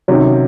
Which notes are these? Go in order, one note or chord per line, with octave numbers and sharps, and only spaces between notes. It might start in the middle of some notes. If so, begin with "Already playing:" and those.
C3 D#3 F#3 C#4